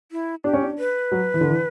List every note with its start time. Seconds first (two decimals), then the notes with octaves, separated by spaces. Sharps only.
0.12 E4
0.44 D4 G4
0.53 C#4
0.62 D4
0.79 B4
1.12 F#3
1.34 E3
1.41 D3
1.48 E3